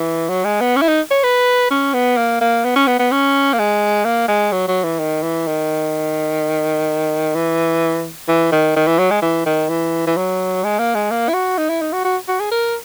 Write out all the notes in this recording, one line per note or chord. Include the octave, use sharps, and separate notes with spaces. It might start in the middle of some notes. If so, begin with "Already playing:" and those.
Already playing: E3
F#3
G#3
B3
C#4
E4
D#4
C#5
B4
C#4
B3
A#3
A#3
B3
C#4
B3
B3
C#4
A#3
G#3
A#3
G#3
F#3
F#3
E3
D#3
E3
D#3
E3
E3
D#3
D#3
E3
F#3
G#3
E3
D#3
E3
E3
F#3
G#3
A#3
G#3
A#3
E4
F#4
D#4
E4
D#4
F#4
F#4
F#4
G#4
A#4